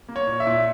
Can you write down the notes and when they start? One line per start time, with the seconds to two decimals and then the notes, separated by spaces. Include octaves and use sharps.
0.08 A#3
0.16 C#5
0.27 A#2
0.40 E5
0.47 A#2